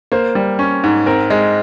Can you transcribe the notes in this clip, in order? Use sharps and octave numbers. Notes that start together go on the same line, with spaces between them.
A#3 C5
G3
C#4
G#2
C4 A#4
G#3